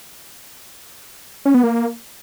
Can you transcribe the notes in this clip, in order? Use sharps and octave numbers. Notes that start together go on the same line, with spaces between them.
C#4
B3
A#3